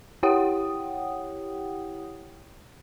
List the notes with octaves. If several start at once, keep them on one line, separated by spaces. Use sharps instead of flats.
E4 G4 C#5 F#5 G5 D#6